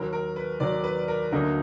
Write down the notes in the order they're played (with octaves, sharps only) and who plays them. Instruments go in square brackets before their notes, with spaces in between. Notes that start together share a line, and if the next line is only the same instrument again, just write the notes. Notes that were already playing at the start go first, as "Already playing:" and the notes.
Already playing: [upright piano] D#2 D#3 F#3 [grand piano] A#4
[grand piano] A#4
B4
[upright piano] D#2 D#3 F#3 [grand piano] D5
[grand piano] B4
A#4
[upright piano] D2 D3 F#3 A#3 D#4 [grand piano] A#4